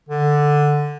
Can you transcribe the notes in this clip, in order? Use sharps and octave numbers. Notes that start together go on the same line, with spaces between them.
D3